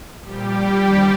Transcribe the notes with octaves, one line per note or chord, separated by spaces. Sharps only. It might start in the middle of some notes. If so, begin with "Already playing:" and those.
A#2 F3 G3 G4
D#2 D3 F3